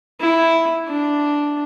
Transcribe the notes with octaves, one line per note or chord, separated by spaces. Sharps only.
E4
D4